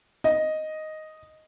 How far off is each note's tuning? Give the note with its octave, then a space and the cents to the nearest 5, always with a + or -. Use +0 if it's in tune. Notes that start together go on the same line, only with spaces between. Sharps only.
D#5 +0